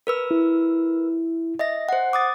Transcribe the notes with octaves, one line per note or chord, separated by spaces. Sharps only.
A#4 B4 E6
E4
D#5 E5 A#6
C5 F#5
D6 D#6 A6